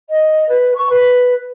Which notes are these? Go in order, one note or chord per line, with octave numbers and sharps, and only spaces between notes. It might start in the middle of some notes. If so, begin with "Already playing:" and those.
D#5
B4
C#6
B4